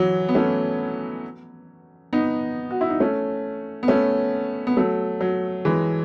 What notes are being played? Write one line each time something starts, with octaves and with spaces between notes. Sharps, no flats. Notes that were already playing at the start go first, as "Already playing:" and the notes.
Already playing: E3 F#3
B3
A3 C#4
B3 D#4
F#4
E4
D#4
A3 C#4
B3
A3 C#4
B3
F#3 A3
F#3
E3 G#3